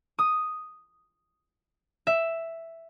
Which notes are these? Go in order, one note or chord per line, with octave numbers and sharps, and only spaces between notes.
D#6
E5